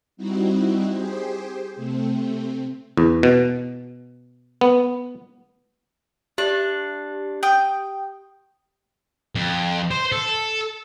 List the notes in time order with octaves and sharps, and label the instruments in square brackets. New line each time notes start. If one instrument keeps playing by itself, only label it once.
[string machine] G3 C4 D#4 E4 F#4
G4 G#4 C5
C3 A3 C4
[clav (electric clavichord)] E2
B2
B3
[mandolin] D4 [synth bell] G4
[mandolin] G5 D#6
[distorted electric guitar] F2
C5
A4